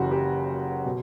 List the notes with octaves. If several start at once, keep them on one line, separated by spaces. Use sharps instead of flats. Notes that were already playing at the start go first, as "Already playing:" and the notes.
Already playing: F#1 F#2 C#3 E3 F#4 G4
G4
B2